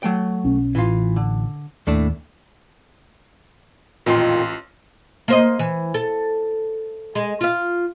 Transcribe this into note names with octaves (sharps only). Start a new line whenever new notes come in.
F#3 A3 G5
B1 C#4
A1 E3 F4
D3
D#2 A2 A3 D4
A1 F2 A#2 D#3 F4 C6
A#3 C5 D#5
E3
A4
G#3
F4 F5